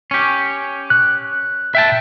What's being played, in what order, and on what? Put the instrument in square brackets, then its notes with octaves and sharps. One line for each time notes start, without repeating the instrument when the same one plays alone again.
[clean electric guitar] C#4 G4
[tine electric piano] F#6
[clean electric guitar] E5 G5 A5